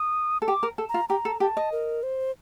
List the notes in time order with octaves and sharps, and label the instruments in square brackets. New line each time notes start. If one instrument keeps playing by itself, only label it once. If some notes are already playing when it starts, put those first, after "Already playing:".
Already playing: [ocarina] D#6
[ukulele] A4
[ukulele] G4 [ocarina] D6
[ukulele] A#4
A4
[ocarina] A#5
[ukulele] F4
[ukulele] G4 [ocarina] A#5
[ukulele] A4
[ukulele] G4 [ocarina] A5
[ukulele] D#5
[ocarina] A#4
C5